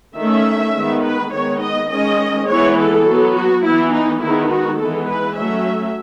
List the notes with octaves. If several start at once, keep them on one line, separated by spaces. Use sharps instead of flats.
D#3 A3 C#4 E5
D#3 G#3 B3
B4
D#3 G#3 B3 C#5
D#5
D#3 G#3 C#4 D#5
E3 G#3 B3 C#5
A4
F#3 B3
F#4
E3 B3 E4
D#4
D#3 G#3 B3 E4
F#4
E3 G#3 B3 A4
B4
F#3 A3 C#4 E5